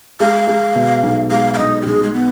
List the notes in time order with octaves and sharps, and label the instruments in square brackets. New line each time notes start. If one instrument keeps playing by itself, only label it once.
[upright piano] G#3 [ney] F5
[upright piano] G#3
B2
B1
[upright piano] G#3 [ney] F5
[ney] F5
[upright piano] B1 [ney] D#5
[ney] G4
[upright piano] B1 [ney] G#4
[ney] G#3
B3